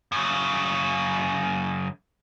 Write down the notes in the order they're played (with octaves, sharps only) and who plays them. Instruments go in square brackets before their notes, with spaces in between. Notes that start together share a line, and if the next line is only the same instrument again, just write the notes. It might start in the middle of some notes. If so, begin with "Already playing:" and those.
[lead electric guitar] F#2 C#3